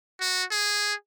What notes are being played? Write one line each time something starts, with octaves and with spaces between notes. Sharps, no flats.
F#4
G#4